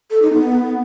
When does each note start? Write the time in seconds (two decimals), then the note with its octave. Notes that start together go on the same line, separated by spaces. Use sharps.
0.11 A4
0.22 D#4
0.34 B3